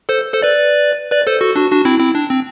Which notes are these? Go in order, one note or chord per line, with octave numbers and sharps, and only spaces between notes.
A4 C5
A4 C5
B4 D5
B4 D5
A4 C5
F#4 A4
D4 F#4
D4 F#4
C4 E4
C4 E4
D4
C4